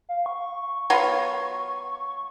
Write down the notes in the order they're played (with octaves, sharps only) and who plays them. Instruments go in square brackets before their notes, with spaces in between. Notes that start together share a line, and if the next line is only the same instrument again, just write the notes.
[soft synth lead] F5
C#6
[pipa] F#3 B3 F4